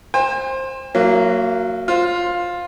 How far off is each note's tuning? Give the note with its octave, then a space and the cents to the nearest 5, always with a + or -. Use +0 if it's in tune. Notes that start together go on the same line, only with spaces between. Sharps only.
C5 +15 G5 +45
F#3 +0 A#3 -10 E4 +35
F4 +10 C5 +0